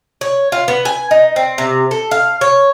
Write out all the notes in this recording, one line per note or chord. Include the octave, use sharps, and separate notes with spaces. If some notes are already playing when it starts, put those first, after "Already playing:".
C#5
F4
B3
G#5
D#4
C4
C3
A4
F5
C#5